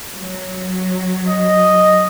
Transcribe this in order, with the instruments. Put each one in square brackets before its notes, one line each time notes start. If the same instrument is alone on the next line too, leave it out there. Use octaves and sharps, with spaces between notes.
[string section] F#3
[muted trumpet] D#5